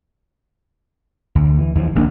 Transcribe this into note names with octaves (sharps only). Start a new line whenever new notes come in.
D2
E3
D#2 E3 F3
D1 A#1 A#3 D4